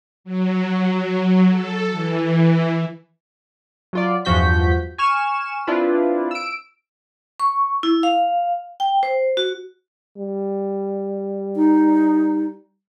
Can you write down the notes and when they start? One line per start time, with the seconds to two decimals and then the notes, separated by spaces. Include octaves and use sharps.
0.24 F#3
1.50 A4
1.91 E3
3.93 F#3 F4 D5
4.25 E2 G2 F3 F#4 G6 B6
4.98 G#5 C#6 F6 E7
5.67 C4 D4 E4 F4 B4
6.31 E6 D7
7.40 C#6
7.83 E4
8.03 F5
8.80 G5
9.03 C5
9.37 F#4
10.18 G3
11.56 D#4